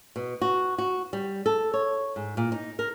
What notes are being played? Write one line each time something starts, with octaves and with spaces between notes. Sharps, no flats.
B2
F#4
F#4
G3
A4
C#5
G#2
A#2
D#4
A#4